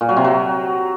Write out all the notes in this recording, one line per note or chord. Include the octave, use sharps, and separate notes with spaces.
A#2
F#3
C3
F#3